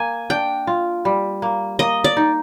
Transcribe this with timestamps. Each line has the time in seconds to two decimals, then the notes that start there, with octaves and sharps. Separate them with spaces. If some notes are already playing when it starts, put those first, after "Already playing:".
Already playing: A#3 G#5
0.30 D4 G5
0.67 F4
1.05 G3
1.42 A#3
1.79 A#3 D#5
2.04 D5
2.17 D#4